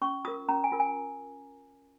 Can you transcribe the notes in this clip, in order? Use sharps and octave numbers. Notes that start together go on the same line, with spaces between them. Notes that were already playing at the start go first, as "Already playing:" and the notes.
C#4 C#6
F4 A#4 D#6
C#4 A#5
G#5
F4 A#4
G#5